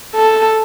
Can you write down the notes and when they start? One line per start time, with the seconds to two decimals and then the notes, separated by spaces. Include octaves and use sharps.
0.15 A4